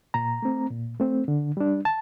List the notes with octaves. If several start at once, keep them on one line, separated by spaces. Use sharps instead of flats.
A#2 A#5
A3 C4
A#2
A3 C4
D3
G3 D4
A5